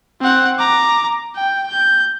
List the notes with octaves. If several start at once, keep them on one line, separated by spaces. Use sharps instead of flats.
C4 F#5
A#5 D6
G5
G6